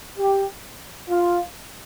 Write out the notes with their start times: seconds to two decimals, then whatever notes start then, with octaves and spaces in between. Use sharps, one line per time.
0.17 G4
1.10 F4